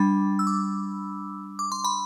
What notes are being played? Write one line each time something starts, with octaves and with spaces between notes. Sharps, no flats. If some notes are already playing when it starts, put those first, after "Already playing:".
Already playing: G3 D4 B5
E6
D6
D6
C6
B5